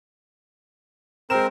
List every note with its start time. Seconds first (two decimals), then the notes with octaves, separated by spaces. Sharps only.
1.30 G#3 C4 A#4 C5 E7